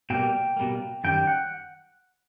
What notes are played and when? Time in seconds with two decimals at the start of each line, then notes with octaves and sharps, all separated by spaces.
0.10 B2 G3 A#3 G5
0.57 B2 G3 A#3
1.04 F#2 D#3 G3 G5
1.27 F#5